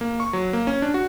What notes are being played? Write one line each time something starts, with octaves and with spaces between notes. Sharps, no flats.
A#3
C#6
F#3
A#3
C#4
D4
F#4